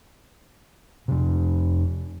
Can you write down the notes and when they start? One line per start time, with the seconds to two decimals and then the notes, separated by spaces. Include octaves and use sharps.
1.08 F2 C3